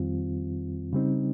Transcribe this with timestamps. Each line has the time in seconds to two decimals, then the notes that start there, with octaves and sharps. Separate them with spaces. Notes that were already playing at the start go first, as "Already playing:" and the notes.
Already playing: F2 D#3 G3 C4 F4
0.93 C#3 G3 C4 D#4